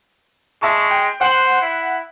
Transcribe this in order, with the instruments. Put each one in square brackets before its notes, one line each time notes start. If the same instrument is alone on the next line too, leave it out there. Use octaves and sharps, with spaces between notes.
[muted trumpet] G#3 [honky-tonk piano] E5 A5 C#6
[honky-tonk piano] G5
[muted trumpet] C5 [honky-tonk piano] F#5 F#7
[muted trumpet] E4